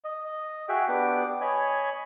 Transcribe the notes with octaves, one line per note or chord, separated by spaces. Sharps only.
D#5
F#4 G#4 E5 G5
B3 D4 G4 D6
C#5 D#5 G#5 B5